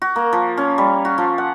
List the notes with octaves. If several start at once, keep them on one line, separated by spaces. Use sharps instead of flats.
F#4
A#3
F3
C#4
G3
F#4
F3
F#5